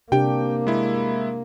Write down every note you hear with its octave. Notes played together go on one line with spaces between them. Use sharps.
C3 A#3 D4 G4 G5
G#3 E4